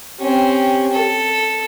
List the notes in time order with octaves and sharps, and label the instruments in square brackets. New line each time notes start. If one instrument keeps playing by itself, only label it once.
[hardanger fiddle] C4 C#4 [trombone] G4
[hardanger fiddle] A4